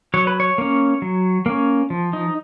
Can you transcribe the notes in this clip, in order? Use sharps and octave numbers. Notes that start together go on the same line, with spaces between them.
F#3 C#5
B4
C#5
A#3 C#4
F#3
A#3 C#4
F3
D#4